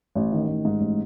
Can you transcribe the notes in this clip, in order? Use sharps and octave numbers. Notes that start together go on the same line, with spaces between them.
A1
D#3
A1
G#2
A1